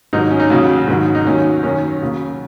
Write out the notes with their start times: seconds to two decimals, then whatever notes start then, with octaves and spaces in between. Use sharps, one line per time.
0.13 G#2 D#3 F#3 D#4
0.31 C#4
0.40 D#4
0.50 D#2 C#3 F#3 F#4
0.88 G#2 D#3 F#3
1.15 D#4
1.25 D#2 D#3 F#3 C#4
1.63 F#2 D#3 F#3 C#4
2.01 D#2 C#3 F#3